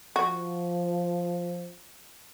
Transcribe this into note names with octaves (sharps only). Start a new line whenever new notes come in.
F3 F#4